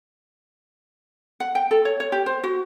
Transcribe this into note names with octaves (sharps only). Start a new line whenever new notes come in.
F#5
G5
A4
C#5
C#5
G4
C5
F#4